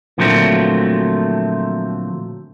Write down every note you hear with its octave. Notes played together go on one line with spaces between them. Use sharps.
A#2 D3 F3 F#3 A3 C4